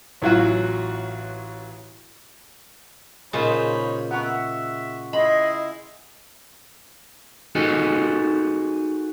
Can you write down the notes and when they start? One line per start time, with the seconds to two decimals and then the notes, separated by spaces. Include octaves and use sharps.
0.22 A1 E3 F#3 F4 F#4
3.33 A#2 C#3 G#3 D#4 C5 C#5 B5
4.11 B3 A#4 F#5 C#6
4.23 E5
5.13 E4 G#4 D#5 B5 C6
7.55 D#4 F#4 G#4 A4 D#5